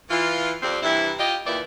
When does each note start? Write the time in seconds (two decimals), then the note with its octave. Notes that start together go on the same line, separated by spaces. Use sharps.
0.10 E3 F4
0.62 F2 G3 C4
0.83 G2 C3 E3 E4
1.19 F4 G4 D#5
1.46 D#2 A#2 D#3 E4 B4 D5